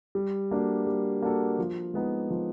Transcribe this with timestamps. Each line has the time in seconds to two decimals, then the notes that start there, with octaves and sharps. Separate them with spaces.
0.15 G3
0.51 A#3 D4 F#4 A4
0.87 G3
1.22 A#3 D4 F#4 A4
1.58 F3
1.94 G#3 B3 D#4
2.30 F3